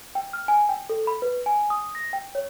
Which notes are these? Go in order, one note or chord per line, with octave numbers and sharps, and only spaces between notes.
G5
F6
G#5
G5
A4
B5
B4
G#5
D#6
A#6
G5
C#5